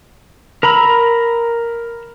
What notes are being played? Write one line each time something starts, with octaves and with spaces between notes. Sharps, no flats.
A#4 A#5 B5 E6